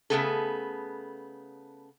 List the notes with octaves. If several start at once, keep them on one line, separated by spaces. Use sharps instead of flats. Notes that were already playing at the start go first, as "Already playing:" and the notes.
C#3 E3 A3 B3 G#4 A4